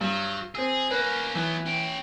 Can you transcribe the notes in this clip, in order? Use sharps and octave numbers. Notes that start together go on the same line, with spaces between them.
G2 F#3
C4 G#4 E6
A#3 C#4 B4
E3 F#3 B3
C#4 G5